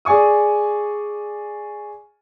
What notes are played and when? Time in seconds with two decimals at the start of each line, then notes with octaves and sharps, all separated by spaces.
0.05 G#4 D5 G#5 C#6 D#6